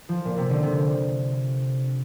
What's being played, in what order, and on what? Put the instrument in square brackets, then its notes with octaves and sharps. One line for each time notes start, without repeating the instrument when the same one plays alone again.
[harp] F3
A#2
C3
D3
C3